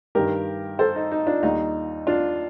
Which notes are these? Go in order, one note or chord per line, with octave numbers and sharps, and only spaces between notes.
G2 D#3 G3 G4 A#4
A4 C5
D#4
D#4
D4 F4
D#2 D#3 G3 D#4
D4 F4